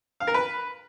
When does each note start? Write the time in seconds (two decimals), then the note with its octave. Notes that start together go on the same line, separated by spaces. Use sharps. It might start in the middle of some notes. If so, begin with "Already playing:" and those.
0.20 F5
0.27 A#4
0.34 B4